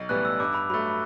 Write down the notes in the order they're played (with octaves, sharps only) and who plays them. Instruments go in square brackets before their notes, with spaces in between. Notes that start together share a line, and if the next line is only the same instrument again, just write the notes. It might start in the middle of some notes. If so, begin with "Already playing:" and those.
Already playing: [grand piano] B1
[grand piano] A2 E3 G3 B3 [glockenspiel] F#6
[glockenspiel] E6
[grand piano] G2 [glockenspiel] D6
[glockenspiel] B5
[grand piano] F#3 A3 [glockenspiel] B5